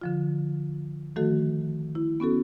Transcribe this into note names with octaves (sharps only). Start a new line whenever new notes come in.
D3 F3 F4
D#3 F3 A3 F#4 A4
E4
B3 C#4 F#4 A4